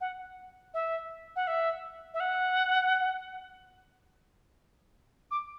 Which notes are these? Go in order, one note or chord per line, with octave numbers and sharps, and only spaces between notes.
F#5
E5
F#5
E5
E5
F#5
D6